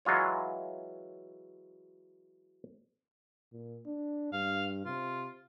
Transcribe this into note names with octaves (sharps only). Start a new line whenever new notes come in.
E3 F#3 G#3 F4 C#5
A#2
D4
G2 F5
C3 F4